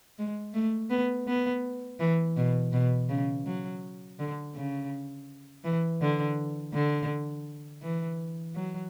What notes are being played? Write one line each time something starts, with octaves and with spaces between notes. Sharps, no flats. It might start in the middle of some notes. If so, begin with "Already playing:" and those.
G#3
A3
B3
B3
E3
B2
B2
C#3
F#3
D3
C#3
E3
D3
D3
E3
F#3